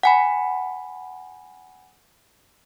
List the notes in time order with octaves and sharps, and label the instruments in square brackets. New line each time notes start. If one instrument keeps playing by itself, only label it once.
[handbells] F#5 G#5 B5